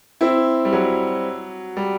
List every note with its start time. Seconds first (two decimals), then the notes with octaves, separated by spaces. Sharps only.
0.21 C4 E4
0.65 G3
0.73 F#3
1.77 G3